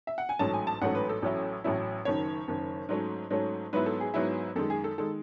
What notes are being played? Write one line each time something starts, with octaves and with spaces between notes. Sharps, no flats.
E5
F#5
G#5
A1 G#2 F#3 A3 C#4 A5
G#5
A5
A1 G#2 F#3 A3 C#4 F#5
B4
A4
A1 A2 F#3 C#4 E4
A1 A2 F#3 C#4 E4
F#1 F#2 D#3 C#5
F#1 F#2 D#3
G#2 F#3 A3 C#4
G#2 F#3 A3 C#4
G#2 F#3 B3 E4 B4
A4
G#4
G#2 F#3 B3 E4
F#2 D#3 G#3 A4
G#4
A4
D#3 G#3 A4